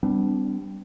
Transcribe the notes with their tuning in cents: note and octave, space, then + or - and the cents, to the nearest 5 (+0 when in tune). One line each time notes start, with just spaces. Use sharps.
G3 +0 B3 +45 D4 -20